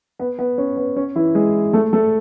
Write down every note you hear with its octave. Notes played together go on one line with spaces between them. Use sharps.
B3
B3
C#4
B3
C#4
E3 E4
G#3 G#4
A3 A4
A3 A4